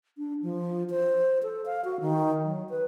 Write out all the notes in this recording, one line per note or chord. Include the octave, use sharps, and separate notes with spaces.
D4
F3
C5
A4
F5
F#4
D#3
F#3
B4